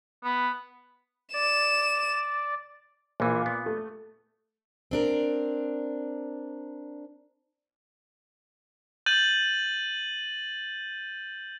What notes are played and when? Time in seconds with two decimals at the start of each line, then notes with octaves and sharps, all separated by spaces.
0.24 B3
1.34 D5 E7
3.20 A#1 A#2 E3
3.46 B3
3.66 A3
4.91 C4 D4 A#4
9.06 G6 A6 D#7 F#7